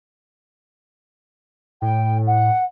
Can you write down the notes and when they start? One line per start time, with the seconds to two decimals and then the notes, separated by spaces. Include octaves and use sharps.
1.82 A2 G5
2.27 F#5